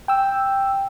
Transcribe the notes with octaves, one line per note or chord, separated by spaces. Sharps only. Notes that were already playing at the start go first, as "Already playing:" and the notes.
G5 E6